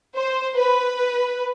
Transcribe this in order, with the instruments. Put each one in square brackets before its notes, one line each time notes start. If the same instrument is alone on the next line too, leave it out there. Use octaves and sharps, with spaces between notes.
[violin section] C5
B4